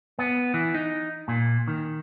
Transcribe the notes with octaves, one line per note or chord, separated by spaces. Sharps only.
B3
E3
D#4
A#2
D#3